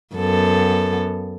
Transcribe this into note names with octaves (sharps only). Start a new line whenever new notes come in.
F#2 B3 A4